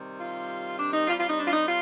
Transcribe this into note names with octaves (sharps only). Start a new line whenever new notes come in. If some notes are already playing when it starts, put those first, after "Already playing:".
Already playing: C3 D#3 G3
F4
D4
D#4
C3 G3 F4
F4
D#4
D4
F4
D#4
F4